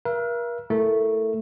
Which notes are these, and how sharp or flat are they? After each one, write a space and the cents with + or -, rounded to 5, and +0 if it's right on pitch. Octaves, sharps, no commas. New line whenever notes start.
A#4 +40 E5 +45
A3 +5 E4 +0 A#4 +0